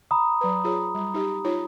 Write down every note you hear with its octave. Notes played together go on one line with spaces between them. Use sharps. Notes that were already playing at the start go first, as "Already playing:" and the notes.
A#5 B5 D#6
F#3 B4
F4 G#4 C#5
G3
D#4 G4
D#4 F4 C#5